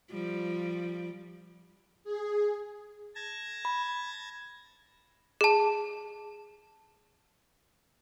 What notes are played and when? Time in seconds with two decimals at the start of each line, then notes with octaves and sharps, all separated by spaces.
0.10 F3 G3
2.04 G#4
3.15 A5 G#6 A#6
3.65 B5
5.41 G#4 A5